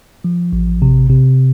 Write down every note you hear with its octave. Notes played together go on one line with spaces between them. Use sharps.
F3
A1
C3
C3